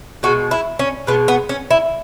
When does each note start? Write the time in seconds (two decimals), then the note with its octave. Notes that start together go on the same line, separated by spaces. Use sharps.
0.23 B2 G#3 F#4
0.51 E4
0.79 C#4
1.07 B2 G#3 B3
1.28 B3
1.49 C#4
1.71 E4